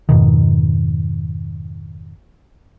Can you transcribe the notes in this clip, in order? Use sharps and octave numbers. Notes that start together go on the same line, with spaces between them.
F2 G#2 B2 D#3